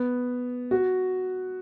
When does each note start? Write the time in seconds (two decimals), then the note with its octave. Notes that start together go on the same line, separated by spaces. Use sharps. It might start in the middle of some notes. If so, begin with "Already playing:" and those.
Already playing: B3
0.71 F#4